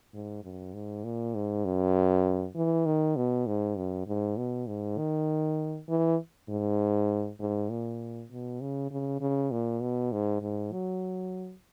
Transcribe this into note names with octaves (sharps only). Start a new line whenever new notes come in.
G#2
F#2
G#2
A#2
G#2
F#2
E3
D#3
B2
G#2
F#2
G#2
B2
G#2
D#3
E3
G#2
G#2
A#2
B2
C#3
C#3
C#3
A#2
B2
G#2
G#2
F#3